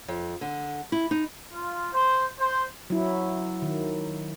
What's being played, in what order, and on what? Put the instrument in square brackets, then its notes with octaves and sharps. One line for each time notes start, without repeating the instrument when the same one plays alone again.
[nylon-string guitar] F2
D3
E4
D#4
[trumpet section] F4
C5
C5
[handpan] F#3 E4
D#3